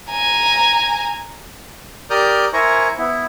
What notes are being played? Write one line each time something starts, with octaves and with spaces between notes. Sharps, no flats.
G#5 A#5
G4 A#4 D5 D#6 F6 G6
E4 A#4 C5 G#5 A#5 C#6
B3 E4